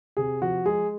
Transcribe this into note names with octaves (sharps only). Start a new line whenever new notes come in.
C3 G#4
F3 F#4
G#3 G#4